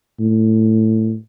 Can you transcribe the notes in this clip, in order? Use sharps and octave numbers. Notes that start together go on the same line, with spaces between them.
A2